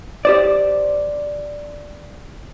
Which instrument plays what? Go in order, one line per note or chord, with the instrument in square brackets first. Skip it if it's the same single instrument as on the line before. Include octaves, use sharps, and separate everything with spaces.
[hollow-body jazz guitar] G4 C5 D5